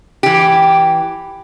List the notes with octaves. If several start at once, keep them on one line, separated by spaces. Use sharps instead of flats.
E3 G4